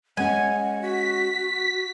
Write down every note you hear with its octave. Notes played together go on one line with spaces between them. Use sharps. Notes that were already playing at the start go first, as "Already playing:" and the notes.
G#3 C#4 F#5 G#5
F#4 B6